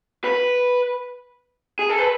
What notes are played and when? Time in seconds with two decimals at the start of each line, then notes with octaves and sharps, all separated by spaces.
0.24 B4
1.79 G#4
1.89 A4
1.99 B4